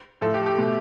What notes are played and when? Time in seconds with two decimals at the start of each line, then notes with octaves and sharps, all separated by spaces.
0.21 A2 F3 A3 A4
0.34 G4
0.46 G4
0.58 B2 A3